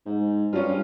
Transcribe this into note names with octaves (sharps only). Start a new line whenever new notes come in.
G#2
G2 C#4 F4